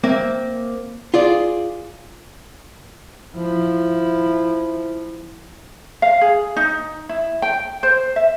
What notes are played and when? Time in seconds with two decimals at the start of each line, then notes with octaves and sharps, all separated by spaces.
0.04 A#3 C4 E5
1.14 F4 G#4 D5
3.35 F3 E4
6.02 F5
6.21 G#4
6.56 D#4
7.09 E4
7.42 G5
7.83 C5
8.16 E5